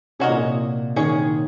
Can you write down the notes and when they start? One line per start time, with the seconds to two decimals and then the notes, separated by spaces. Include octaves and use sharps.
0.19 C3 C#4 F#4 A#4 D#5
0.29 A#2
0.37 C3
0.96 D#3 C#4 G#4 C#5